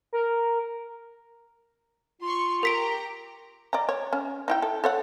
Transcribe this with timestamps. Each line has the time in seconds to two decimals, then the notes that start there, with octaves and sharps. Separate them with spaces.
0.13 A#4
2.21 F4 C6 C#6
2.63 G4 A#4 A#5 B6 D7
3.73 D5 D#5 A#5
3.89 C#5
4.13 C#4
4.48 D#4 E4 G5
4.62 A4
4.84 A4 C#5 F#5